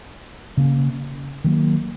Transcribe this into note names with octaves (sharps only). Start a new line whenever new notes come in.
C#3 A#3 C#4
D#3 F#3 A#3